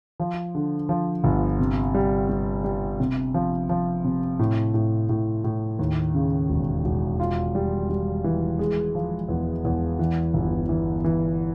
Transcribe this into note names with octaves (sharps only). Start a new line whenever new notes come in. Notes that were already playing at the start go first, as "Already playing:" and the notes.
F3
D3
F3
G1
C3
G3
G3
G3
C3
F3
F3
C3
A2
A2
A2
A2
D#2
C#3
E1
E1
F4
G3
G3
E3
G#3
F3
E2
E2
E3
G1
E3
E3